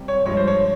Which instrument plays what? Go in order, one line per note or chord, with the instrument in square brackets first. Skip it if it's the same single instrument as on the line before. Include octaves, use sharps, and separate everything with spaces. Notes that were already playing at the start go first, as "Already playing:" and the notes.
Already playing: [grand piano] C3 G3
C#5
G2 F3 G#3 C#5
C5
C#5